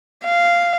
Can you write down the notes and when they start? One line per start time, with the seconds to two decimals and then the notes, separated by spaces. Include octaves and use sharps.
0.25 F5